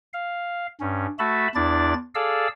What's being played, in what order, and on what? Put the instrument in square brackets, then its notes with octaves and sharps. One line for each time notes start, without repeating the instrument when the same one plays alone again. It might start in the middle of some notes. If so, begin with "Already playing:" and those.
[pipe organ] F5
G2 C#4
A3 F#4 E5 A5 B5
E2 D4 E4 D5 A6
G#4 A4 D5 F5 E6